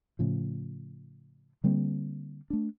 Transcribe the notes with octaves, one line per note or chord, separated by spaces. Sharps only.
A2 C#3 F3
D3 G3 A#3 C4
A3 D4